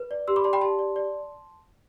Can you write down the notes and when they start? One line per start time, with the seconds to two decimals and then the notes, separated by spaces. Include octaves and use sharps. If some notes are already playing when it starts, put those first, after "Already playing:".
Already playing: B4
0.11 D5
0.28 G4 C6 E6
0.36 B5 D6
0.44 D5 A5 C6
0.53 G5 B5
0.61 G4 A5 C6
0.79 D5
0.96 D5